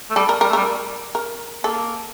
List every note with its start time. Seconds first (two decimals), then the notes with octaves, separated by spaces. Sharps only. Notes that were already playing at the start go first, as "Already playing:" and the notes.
0.10 A3
0.16 G3 A4
0.29 A#4
0.41 G3 A#4
0.50 A3
0.53 G3 A#4
1.15 A#4
1.64 A#3 A4